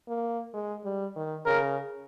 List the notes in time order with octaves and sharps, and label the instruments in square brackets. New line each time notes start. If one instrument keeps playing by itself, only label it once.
[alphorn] A#3
G#3
G3
D#3
[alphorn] C#3 [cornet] A#4